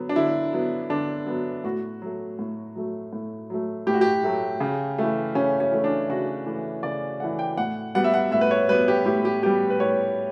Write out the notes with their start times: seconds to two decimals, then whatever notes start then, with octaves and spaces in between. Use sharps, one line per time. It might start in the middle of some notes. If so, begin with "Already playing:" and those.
Already playing: D3 F#3 B3
0.09 D4
0.16 D3 E4
0.53 F#3 B3
0.90 D3 D4
1.27 F#3 B3
1.64 A2 F#4
2.02 F#3 A3
2.39 A2
2.76 F#3 A3
3.13 A2
3.50 F#3 A3
3.87 A2 G4
3.94 F#4
4.01 G4
4.24 F#3 A3
4.60 C#3
4.98 E3 A3
5.35 C#3 C#4
5.60 C#4
5.72 E3 A3
5.84 D4
6.09 C#3 F#4
6.46 E3 A3
6.83 C#3 D5
7.20 E3 A3 F#5
7.39 G5
7.57 A2 F#5
7.95 G3 B3 F#5
8.04 E5
8.14 F#5
8.32 A2 E5
8.41 B4
8.51 C#5
8.69 G3 B3 B4
8.88 G4
9.06 A2 G4
9.25 G4
9.42 G3 B3 G4
9.70 B4
9.80 A2 C#5